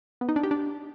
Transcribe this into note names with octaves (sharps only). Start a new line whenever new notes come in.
B3
D#4
D4
G4
D4